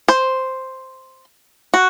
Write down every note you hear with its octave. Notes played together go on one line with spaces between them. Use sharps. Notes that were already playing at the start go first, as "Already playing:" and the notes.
C5
F#4